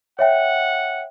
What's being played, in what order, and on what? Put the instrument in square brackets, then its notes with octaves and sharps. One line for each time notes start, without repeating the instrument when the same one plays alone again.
[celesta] C#5 E5 G5 [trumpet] F#5